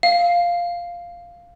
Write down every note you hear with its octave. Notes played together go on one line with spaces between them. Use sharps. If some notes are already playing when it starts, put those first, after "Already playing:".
F5